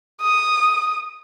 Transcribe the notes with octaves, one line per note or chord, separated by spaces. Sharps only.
D#6